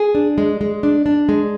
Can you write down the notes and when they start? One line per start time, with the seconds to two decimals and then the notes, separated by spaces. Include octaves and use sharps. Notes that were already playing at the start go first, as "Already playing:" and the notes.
Already playing: G#4
0.15 D4
0.38 G#3
0.61 G#3
0.83 D4
1.06 D4
1.29 G#3